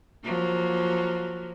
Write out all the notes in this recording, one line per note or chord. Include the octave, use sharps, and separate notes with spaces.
F3 F#3 A#3